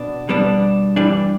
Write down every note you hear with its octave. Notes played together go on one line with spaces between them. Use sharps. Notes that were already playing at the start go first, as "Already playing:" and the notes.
Already playing: B2 B3 D4
B2 G3 B3 D4
G2 E3 G3 D4